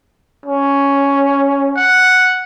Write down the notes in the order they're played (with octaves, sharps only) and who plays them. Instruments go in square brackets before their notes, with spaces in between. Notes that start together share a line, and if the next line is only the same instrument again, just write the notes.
[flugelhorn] C#4
[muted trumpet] F#5